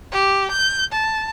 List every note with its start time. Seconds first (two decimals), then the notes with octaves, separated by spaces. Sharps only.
0.12 G4
0.51 G6
0.92 A5